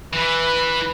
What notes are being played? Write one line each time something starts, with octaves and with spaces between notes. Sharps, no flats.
E3 B4